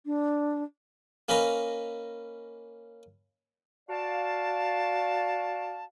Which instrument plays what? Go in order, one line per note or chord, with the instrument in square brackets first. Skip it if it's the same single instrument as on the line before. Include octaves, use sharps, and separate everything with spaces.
[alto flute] D4
[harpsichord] A#3 C#4 B4 D#5 A#5
[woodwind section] F#4 D5 F5 A5